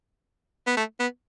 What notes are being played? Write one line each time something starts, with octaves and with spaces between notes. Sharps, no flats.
B3
A3
B3